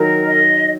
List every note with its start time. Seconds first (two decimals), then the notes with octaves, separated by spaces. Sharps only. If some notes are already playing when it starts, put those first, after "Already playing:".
Already playing: D#3 F#3 A#4
0.26 D#5